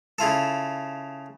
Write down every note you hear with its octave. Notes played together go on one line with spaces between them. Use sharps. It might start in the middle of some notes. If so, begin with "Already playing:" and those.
C#3 E4 F4 A4